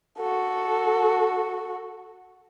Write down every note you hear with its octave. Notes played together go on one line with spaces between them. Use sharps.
F#4 A4